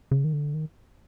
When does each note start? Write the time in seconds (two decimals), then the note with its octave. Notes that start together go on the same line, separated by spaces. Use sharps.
0.11 C#3
0.24 D#3
0.33 D3
0.54 D#3